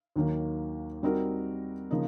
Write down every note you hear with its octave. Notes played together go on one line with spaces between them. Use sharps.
D#2 D#3 F#3 A#3
G3 C4 D#4 F#4 A#4
C#3 F3 A#3 D#4